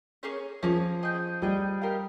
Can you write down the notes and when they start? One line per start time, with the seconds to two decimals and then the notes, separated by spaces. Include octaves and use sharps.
0.23 A#3 C#4 G#4 C#5
0.63 F3 A#3 C#4 G#4 C#5
1.03 G#4 D#5 G5
1.42 G3 G#4 D#5 G5
1.82 D#4 G4 A#4 F5